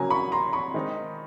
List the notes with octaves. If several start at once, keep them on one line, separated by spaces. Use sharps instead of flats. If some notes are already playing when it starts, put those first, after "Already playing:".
Already playing: C#3 F#3 A#3 G#5 A#5
B5 C#6
A#5 C6
B5 C#6
D#3 G#3 C4 D#4